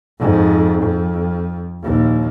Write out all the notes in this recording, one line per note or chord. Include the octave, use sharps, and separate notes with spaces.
F2 G#2
F2
A#1 D#2